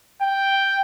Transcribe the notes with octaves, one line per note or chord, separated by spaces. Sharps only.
G5